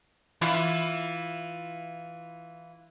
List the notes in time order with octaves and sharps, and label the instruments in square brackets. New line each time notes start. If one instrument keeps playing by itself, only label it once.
[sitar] E3 E4 F4